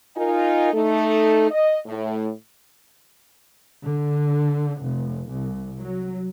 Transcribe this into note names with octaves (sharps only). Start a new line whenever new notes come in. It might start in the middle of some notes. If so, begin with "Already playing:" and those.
D#4 F4 A#4 G#5
A3 D#4 A4
D#5
A2
D3
F1
C2
F#3